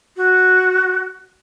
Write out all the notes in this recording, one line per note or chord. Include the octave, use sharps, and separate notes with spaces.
F#4